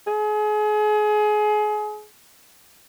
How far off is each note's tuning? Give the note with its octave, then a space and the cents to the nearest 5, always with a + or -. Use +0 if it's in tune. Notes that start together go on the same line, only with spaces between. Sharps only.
G#4 +30